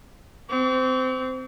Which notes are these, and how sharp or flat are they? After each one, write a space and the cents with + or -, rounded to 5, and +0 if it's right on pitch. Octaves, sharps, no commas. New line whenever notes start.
C4 -20 C#6 +45